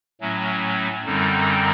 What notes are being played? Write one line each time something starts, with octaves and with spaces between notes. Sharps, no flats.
A2 F#3 A3 C#4
F#2 D3 G3 C4 D#4